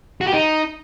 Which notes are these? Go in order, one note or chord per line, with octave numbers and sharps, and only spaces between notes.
F#4
G4
D#4